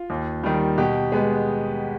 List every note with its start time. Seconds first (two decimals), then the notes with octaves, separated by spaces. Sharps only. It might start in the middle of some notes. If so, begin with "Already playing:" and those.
Already playing: F4
0.10 D#2
0.43 D#3 G3
0.78 B2 G4
1.12 G#3 B3